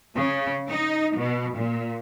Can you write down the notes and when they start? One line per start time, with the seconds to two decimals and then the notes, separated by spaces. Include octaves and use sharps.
0.17 C#3
0.69 D#4
1.18 B2
1.56 A#2